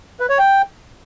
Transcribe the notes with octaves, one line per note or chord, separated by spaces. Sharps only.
B4
C#5
G5